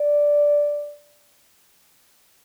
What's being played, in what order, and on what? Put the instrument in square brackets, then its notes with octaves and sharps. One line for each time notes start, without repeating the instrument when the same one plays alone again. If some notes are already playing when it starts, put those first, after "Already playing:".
Already playing: [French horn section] D5